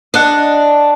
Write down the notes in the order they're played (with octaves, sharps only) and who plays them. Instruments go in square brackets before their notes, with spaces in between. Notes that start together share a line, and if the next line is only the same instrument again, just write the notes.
[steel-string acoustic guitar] D4 [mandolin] D#5 F#5